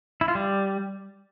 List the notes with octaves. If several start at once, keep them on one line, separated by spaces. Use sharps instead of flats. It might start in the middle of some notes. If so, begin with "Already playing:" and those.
E4
F4
G3